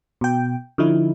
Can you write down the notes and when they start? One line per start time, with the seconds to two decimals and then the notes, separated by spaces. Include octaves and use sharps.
0.21 B2 G5
0.78 D3 F3 D#4 E4